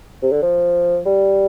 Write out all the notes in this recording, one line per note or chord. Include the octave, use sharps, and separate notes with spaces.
C3
D3
F3
G3